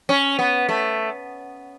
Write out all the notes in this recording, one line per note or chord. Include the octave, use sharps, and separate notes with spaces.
C#4
B3
A3